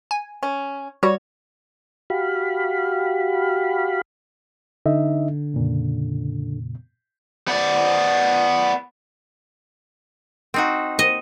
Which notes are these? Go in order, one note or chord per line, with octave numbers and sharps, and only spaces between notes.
G#5
C#4
G3 F#4 C#5
F#4 G4 F5 B5
D3 D#4 D#5 E5
F2 A#2 C#3
B3 D5
C4 D#4 F#4
D#5